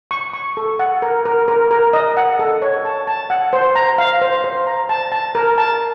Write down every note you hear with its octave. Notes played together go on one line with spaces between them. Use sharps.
C#6
C#6
A4
F#5
A#4
A#4
A#4
A#4
D#5
F#5
A4
C#5
A5
A5
F#5
C5
A#5
F5
C5
C5
A#5
A5
A5
A#4
A5